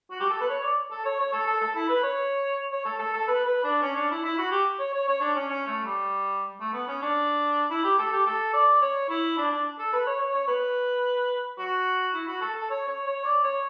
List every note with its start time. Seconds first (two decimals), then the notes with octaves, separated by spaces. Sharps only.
0.11 F#4
0.20 G4
0.30 A4
0.41 B4
0.49 C#5
0.63 D5
0.91 A4
1.05 C#5
1.20 C#5
1.33 A4
1.47 A4
1.61 A4
1.75 E4
1.89 B4
2.03 C#5
2.72 C#5
2.85 A4
2.99 A4
3.14 A4
3.28 B4
3.45 B4
3.64 D4
3.82 C#4
3.96 D4
4.11 E4
4.25 E4
4.38 F#4
4.51 G4
4.79 C#5
4.94 C#5
5.08 C#5
5.21 D4
5.36 C#4
5.49 C#4
5.67 A3
5.85 G3
6.60 A3
6.73 B3
6.88 C#4
7.02 D4
7.71 E4
7.84 G4
7.98 A4
8.12 G4
8.26 A4
8.53 D5
8.81 C#5
9.09 E4
9.37 D4
9.51 D4
9.79 A4
9.93 B4
10.07 C#5
10.20 C#5
10.34 C#5
10.47 B4
11.58 F#4
12.14 E4
12.28 F#4
12.41 A4
12.55 A4
12.70 C#5
12.88 C#5
13.07 C#5
13.24 D5
13.43 C#5